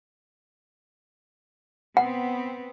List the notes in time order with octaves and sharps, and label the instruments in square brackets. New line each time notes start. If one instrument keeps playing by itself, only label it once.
[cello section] B3 C4 [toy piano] F#5